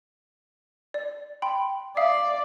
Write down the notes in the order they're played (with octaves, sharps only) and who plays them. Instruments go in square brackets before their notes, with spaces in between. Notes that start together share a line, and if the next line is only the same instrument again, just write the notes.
[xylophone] D5
G5 B5 C6
[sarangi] D5 [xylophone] E5 F5 D#6